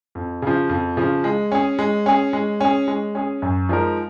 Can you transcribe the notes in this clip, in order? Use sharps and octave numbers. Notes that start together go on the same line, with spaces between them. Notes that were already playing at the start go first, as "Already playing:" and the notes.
F2
C#3 F3
F2
C#3 F3
G#3
C#4 G#4
G#3
C#4 G#4
G#3
C#4 G#4
G#3
C#4 G#4
F#2
F3 G#3 D#4 A#4